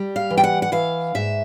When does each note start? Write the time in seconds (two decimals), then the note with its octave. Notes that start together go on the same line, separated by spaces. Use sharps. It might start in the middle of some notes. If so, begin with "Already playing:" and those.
Already playing: G3
0.16 F5
0.30 E3
0.37 G5
0.44 F#5
0.62 F#5
0.72 E3 F5
1.15 G#2 E5